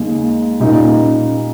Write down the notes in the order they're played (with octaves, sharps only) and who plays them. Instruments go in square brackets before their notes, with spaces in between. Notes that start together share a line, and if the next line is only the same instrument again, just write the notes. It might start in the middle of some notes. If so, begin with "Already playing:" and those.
Already playing: [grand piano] D#2 C#3 G#3 [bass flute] A#3
[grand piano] A#2 G3 A#3 D#4 [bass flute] C#4